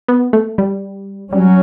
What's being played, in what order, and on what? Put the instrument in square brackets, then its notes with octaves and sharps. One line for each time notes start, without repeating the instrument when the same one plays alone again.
[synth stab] B3
A3
G3
[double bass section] F#3 C#4 [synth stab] G3